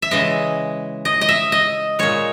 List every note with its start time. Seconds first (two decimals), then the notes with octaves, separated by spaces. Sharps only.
0.02 E5
0.11 C#3 E3 G#3 D#5
1.05 D#5
1.21 D#5
1.29 E5
1.52 D#5
1.99 A#2 G#3 C#5